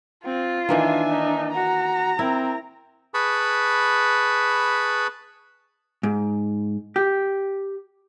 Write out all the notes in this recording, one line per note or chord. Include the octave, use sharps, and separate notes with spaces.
C4 F4
D#3 E3 A#3 D4 E5 G#5
D#4
F#4 A#5
C4 E4 A#4
G#4 B4 A5 B5 C#6
G#2
G4